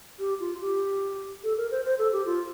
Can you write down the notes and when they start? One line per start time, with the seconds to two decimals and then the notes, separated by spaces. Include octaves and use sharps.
0.19 G4
0.40 F4
0.61 G4
1.44 A4
1.57 A#4
1.71 C5
1.85 C5
1.99 A4
2.12 G4
2.26 F4